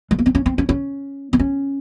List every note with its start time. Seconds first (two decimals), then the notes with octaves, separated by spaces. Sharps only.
0.11 G#3
0.19 A#3
0.26 C4
0.35 C#4
0.46 C4
0.58 C#4
0.69 C#4
1.33 C4
1.39 C#4